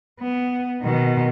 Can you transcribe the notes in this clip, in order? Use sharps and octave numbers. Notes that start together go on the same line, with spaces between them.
B3
B2 D#3